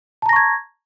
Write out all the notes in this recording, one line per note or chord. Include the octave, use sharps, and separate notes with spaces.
A5 A#5 C#6 G#6 A#6